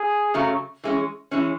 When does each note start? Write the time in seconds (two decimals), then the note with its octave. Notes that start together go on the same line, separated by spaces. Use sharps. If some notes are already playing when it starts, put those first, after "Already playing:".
Already playing: G#4
0.34 F#2 C#3 F#3 A3
0.84 E3 G#3 C#4
1.31 E3 G#3 C#4